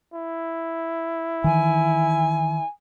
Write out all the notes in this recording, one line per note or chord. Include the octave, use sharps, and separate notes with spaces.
E4
D#3 E3 G#5